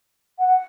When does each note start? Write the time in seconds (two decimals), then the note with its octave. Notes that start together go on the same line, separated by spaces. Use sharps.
0.39 F#5